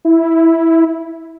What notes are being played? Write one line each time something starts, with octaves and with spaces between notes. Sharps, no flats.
E4